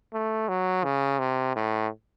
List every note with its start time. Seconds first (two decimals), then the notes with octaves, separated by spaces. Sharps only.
0.14 A3
0.49 F#3
0.84 C#3
1.19 C3
1.56 A2